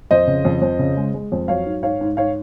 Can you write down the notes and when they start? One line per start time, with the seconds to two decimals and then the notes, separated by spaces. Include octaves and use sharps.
0.11 F2 C5 D#5
0.27 C#3
0.45 F2
0.62 F2
0.79 C#3
0.97 G#3
1.14 G#3
1.32 F2
1.48 F#3 C#5 F5
1.66 G#2
1.83 G#2 C#5 F5
2.01 G#2
2.17 G#2 C#5 F5